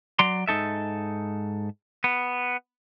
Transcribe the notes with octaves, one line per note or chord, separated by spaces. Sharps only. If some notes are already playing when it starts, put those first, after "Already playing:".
F#3 D5 A#5 C6
G#2 G#3 D#4 A4 E5
B3